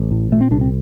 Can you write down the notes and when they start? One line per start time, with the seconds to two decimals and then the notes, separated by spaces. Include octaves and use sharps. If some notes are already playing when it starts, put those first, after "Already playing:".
Already playing: A1
0.11 A2
0.32 A#2 A3
0.41 C4
0.51 C2 D4
0.61 C4